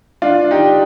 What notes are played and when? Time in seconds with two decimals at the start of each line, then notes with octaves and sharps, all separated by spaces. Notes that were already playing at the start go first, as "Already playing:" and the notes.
0.22 D4 F4
0.51 D#4 G4